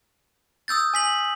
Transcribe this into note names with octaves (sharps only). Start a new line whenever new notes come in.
D#6 E6 G6 A6
G#5 B6 F#7